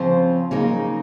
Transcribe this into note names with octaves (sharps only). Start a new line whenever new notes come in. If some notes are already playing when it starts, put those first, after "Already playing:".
Already playing: C#3 F3 C4 F4 C5
C#3 F#3 A#3 D#4